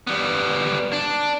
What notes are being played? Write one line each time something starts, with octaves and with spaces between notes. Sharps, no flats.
G3 B3
D4